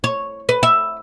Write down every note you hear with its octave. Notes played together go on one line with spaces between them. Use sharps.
C#5
B4
E5